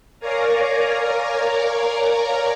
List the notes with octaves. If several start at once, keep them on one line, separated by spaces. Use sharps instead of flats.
A#4 C#5 D5 F5 G#5 A#5